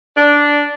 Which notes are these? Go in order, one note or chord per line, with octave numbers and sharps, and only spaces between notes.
D4